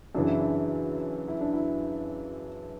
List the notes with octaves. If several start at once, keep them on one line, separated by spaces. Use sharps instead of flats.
F#2 C#3 E3 D4
E4
D4
E4
D4
E4